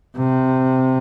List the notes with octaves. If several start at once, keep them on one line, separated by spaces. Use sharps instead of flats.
C3